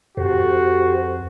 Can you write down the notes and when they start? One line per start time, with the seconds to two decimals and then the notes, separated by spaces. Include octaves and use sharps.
0.17 F2 F#4 G4 A4 C5